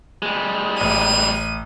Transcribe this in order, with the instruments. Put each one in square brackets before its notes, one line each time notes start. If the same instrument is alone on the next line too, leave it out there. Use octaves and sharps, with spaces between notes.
[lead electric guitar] G3 G#3
[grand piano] A1 [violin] D#7